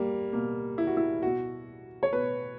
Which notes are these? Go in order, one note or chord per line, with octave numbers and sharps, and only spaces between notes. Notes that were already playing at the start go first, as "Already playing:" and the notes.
Already playing: G3 A#3
B2 A#3
E4
F#4
E4
B2 F#4
C#5
B2 B4